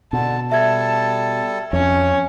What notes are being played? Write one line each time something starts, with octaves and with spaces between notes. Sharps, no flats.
B2 D3 A5
G3 A4 E5 A5 G#6
F2 C#4 C#5